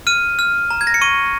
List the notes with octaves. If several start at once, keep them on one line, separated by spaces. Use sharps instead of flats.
F6 D#7
F6
A#5
G#6
A#6
C#7
C#6 D#7